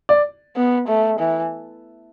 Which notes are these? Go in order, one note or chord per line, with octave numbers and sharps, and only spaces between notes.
D5
B3
A3
E3